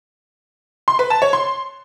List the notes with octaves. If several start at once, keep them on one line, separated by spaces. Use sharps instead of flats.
C6
B4
A5
C#5
C6